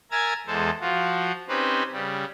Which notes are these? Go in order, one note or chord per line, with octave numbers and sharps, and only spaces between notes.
A#4 E5 G#5 A#5 G#6 A6
E2 G#3 A4 C5
F3 F4 F#4
C4 C#4 D#4 G4 B4 C5
C#3 G3